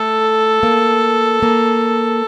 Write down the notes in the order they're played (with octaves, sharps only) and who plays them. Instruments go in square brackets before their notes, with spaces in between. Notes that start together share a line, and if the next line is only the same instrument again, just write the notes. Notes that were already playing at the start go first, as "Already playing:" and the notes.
Already playing: [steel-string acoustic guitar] A3 [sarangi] A4
[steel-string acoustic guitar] A#3
A#3